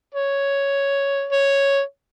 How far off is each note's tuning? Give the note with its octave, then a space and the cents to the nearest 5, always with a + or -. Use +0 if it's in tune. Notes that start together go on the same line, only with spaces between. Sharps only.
C#5 +5
C#5 +0